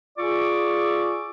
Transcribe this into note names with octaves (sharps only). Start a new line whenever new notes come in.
F4 G#4 D5 C#6 D6 E6